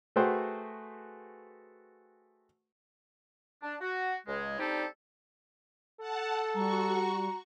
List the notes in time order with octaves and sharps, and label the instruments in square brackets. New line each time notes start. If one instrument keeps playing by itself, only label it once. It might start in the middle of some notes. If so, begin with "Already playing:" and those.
[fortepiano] A3 F#4 G#4 B4 C5 G5
[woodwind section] D4
F#4
C#2 G#3
G3 C4 D4 D#4 G4 A4
[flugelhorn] A4 [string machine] F#5 A5
[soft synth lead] G3 [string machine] F#4 C#6 [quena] A#5